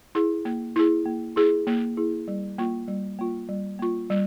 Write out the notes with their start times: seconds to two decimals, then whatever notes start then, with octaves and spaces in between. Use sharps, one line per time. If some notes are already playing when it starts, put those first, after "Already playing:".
0.15 E4 G#4
0.45 A#3
0.76 E4 G#4
1.06 A#3
1.36 E4 G#4
1.67 A#3
1.97 E4 G#4
2.28 G3
2.58 A#3 F4
2.88 G3
3.19 A#3 F4
3.49 G3
3.79 A#3 F4
4.10 G3